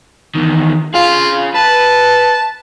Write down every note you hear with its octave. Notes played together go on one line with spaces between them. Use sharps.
E2 D#3
F4 G#4 F5
B4 A5